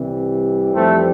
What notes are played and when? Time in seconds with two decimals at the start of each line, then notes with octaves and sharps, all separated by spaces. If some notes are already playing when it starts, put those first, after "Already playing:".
Already playing: C2 C3 E3 G3
0.73 F2 E3 G3 A3 C4